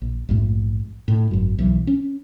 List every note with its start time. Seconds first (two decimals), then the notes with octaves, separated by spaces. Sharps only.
0.02 A#1
0.29 A#1 F2 G#2 A3
1.08 A2
1.31 G#1 F#2
1.58 B1 E3 F#3
1.87 C#4